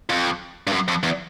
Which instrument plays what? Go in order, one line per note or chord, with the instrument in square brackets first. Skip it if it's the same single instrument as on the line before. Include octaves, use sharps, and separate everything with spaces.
[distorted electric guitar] F2
G2
F#2
F2
E2